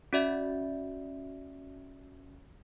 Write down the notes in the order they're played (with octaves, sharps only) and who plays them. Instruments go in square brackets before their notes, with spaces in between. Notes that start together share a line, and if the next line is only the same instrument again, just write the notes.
[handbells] C#4 F#4 D5 E5